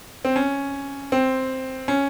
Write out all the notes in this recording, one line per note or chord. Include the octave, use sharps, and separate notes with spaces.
C4
C#4
C4
C#4